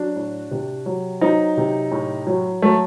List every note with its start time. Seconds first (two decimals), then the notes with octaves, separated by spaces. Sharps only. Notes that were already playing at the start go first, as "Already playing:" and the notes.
Already playing: F#3 D4 F#4
0.16 A2
0.51 C3
0.86 F#3
1.21 F#3 C4 D#4
1.57 C3
1.91 A2
2.27 F#3
2.62 F#3 A3